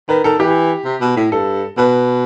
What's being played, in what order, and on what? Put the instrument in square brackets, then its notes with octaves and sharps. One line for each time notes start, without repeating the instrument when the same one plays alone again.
[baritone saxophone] D#3 [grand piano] B4
[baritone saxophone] D#3 [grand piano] A4
[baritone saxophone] E3 [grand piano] G4
[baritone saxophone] C3
B2
A2
[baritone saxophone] G2 [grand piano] A4
[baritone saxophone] B2 [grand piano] B4